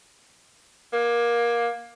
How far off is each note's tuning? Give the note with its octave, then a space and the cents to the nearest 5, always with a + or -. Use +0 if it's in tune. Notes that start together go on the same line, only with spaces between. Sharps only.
A#3 +20